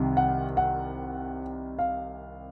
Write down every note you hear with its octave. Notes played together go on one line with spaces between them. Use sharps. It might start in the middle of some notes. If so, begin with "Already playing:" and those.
Already playing: C2 C3 D#3
F#5
F#5
F5